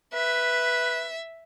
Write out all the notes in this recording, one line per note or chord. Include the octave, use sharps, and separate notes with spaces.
B4 E5